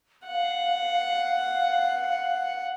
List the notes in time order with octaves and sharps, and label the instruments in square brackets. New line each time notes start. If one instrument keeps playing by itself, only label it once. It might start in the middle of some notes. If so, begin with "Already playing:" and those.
[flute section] F5 [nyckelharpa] F#5